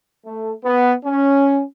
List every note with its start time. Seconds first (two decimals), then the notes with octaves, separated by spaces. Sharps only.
0.24 A3
0.64 B3
1.05 C#4